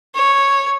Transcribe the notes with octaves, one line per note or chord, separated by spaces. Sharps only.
C#5